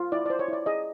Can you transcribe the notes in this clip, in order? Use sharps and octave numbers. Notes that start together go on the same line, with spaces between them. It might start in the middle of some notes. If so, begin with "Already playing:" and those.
Already playing: F4
E4 D5
C5 D5
C#5
E4 D5
G#4 D#5